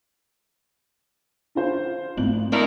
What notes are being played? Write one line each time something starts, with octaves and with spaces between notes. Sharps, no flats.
D4 F4 C5
G#1 A3 F#7
D#3 D4 E4 A4 A#4